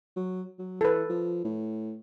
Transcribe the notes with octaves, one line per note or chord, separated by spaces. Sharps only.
F#3
F#3
E3 A4 B4
F3
A2